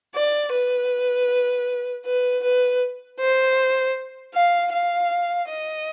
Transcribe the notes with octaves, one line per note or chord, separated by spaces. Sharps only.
D5
B4
B4
B4
C5
F5
F5
D#5